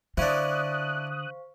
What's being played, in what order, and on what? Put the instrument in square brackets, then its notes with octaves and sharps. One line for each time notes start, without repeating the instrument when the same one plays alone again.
[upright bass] D3 [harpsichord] D4 E4 [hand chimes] C5 F5 C#6 [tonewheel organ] D#6 F#6